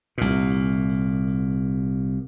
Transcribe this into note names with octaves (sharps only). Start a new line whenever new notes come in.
C2 A#2